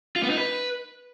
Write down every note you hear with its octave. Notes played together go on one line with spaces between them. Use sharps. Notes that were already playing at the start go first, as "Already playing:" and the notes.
F4
B3
D#4
B4